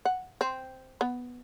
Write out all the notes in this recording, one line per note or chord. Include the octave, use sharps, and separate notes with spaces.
F#5
C4
B3